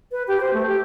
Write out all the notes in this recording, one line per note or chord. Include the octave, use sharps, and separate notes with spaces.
B4
G4
C5
A3
G4